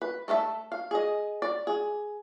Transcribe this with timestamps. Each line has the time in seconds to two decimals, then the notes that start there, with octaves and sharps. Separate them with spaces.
0.02 B4
0.28 A3 A4 A#4 E5
0.72 F5
0.91 G#4 D#5
1.42 D5
1.67 G#4